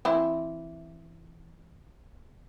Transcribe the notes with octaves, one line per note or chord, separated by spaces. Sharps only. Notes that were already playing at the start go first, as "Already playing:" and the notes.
E3 C4 E4